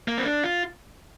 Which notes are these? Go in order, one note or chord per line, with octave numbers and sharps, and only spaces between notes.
A#3
C4
D4
F4